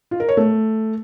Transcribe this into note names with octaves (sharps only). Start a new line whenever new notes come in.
F4
A#4
C#5
A3